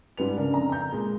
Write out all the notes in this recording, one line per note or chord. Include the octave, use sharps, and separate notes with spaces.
G#2 G3 B4 F7
C#2 C#3 D4 A#4
F2 A#5
A#5 G6
A#2 G#3